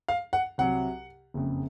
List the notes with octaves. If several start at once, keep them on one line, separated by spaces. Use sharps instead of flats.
F5
F#5
C2 C3 F#3 F#5
F#1 F2 C#3